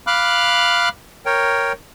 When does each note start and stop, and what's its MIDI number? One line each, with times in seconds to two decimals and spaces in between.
0.07 0.89 77
0.07 0.89 83
0.07 0.89 86
0.07 0.89 89
0.07 0.89 90
1.26 1.72 70
1.26 1.72 73
1.26 1.72 79